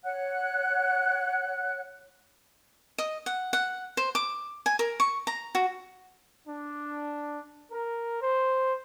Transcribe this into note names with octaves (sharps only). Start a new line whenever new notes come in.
C#5 F#5 F#6
D#5
F#5
F#5
C5
D6
G#5
A#4
C#6
A#5
F#4
D4
A#4
C5